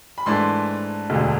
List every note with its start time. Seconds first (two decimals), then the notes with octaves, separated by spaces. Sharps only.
0.18 B5
0.26 G#2 E3 A3 D4 C6
1.10 E1 D2 D3